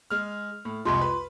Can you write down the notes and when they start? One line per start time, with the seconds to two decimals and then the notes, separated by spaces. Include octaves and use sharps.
0.10 G#3 F6
0.65 A2
0.85 C2 F2 G#3 F4 C6
1.01 B4